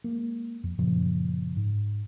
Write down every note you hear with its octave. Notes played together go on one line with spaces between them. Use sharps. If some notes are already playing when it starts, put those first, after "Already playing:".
G#3 A#3
F2
F#2 A#2 C#3 F3
G#2